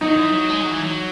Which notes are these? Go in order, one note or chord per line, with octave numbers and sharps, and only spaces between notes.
F#3 D#4
E3
F#3
G#3
F#3
E3
F#3